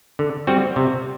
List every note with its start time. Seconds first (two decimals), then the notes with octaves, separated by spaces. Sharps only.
0.19 D3
0.47 G3 C4 F#4
0.76 C3